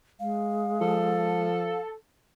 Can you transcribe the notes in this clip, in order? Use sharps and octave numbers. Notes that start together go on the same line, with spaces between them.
G#3 F5
F3 A4